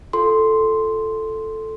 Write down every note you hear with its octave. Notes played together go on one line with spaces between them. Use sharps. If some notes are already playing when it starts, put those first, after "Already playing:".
F4 A4 C6